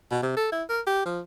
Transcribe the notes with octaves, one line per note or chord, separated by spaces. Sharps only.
B2
C3
A4
E4
A#4
G4
F3